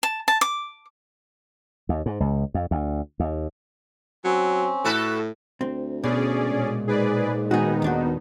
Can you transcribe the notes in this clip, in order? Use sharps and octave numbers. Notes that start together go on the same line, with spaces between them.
A5
A5
D6
D#2
G#2
C#2
F2
D2
D#2
F#3 C4 C#4
A2 F#4 A4 B4
D2 C4
B2 C#4 G#4 D5
A#2 G#3
G#2 G#4 B4 D5
D#3 B3 D#4 F#4 G#4
D#2 D4 F#4